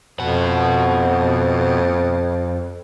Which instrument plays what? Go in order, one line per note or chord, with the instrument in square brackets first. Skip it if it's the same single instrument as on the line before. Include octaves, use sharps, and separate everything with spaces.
[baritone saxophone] F2 [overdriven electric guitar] B2 F#5